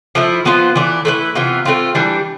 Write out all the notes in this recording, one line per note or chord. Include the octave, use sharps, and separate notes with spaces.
F3 A3 E4
F3 B3 F4 C5
E3 A3 D4
A3 E4 B4
C3 E3 B3 F4
A3 C4 F4
E3 G3 D4